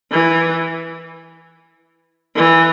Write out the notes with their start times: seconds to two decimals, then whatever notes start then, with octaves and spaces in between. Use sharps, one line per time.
0.12 E3
2.36 E3